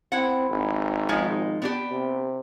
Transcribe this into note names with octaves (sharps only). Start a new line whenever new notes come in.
C4 E4 F#5
G#1
F3 G#3 D#4
B3 D4 G4
C3